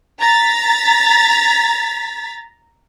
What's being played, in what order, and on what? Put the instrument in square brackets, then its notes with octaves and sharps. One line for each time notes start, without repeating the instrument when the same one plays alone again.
[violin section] A#5 A6 B6